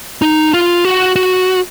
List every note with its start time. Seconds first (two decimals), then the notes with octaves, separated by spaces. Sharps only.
0.22 D#4
0.53 F4
0.85 F#4
1.16 F#4